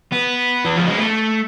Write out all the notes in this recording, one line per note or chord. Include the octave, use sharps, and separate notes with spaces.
B3
E3
F3
G#3
A3